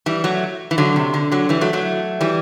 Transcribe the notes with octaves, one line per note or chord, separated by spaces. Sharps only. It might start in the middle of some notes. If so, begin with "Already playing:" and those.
E3 G3
F#3 A3
E3
D3 F#3
C3
D3
D3 F#3
E3 G3
F#3 A3
F#3 A3
E3 G3